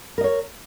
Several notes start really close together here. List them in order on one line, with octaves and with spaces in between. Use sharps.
A#4 D#5 C#5